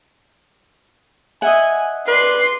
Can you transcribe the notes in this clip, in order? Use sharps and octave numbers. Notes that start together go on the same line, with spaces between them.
D#5 E5 F#5 G#5
B4 D5 C6 C7